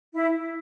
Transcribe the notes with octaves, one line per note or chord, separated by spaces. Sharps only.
E4